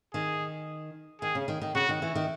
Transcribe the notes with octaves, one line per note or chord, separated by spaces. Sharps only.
D#3 G#4
D#3 G#4
C#3
D#3
D#3
C#3 F#4
D#3
E3
D#3